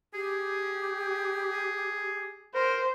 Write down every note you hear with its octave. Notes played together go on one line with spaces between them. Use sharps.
G4 G#4
A#4 C5